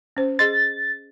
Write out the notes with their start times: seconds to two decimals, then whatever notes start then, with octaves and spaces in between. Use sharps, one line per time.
0.17 C#4 C5
0.39 G#4 D#5 C6 A6